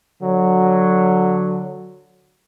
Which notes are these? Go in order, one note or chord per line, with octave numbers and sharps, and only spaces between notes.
D3 F#3